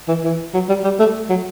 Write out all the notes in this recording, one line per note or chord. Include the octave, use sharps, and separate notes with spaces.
E3
E3
F#3
G3
G3
A3
F#3